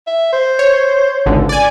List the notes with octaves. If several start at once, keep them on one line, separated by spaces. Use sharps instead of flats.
E5
C5
C#5
G#1 C#2 D3
D5 G#5